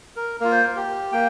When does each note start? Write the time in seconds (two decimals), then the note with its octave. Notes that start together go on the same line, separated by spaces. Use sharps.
0.16 A#4
0.40 A#3 F4 A#4
0.52 C5
0.64 A#4
0.76 G4
1.12 A#3 G5